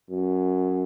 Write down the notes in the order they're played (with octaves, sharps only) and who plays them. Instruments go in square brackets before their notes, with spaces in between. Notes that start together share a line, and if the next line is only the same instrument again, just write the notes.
[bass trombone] F#2